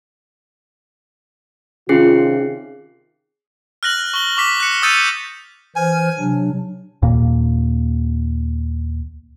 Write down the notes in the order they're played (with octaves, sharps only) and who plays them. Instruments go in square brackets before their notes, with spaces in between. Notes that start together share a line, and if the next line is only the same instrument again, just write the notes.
[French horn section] C3 D#3 F4 [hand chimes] C#4 G#4 C7
[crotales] F6 F#6 A#6 F#7
C#6 G7
C#6 D6 B6 G7
F#6 C#7
D#6 E6 G6 A6 C#7 D#7
[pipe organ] E3 C5 F6 [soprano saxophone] G#5
[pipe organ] C3 F#3 D4
[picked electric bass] D#2 A#2 A#3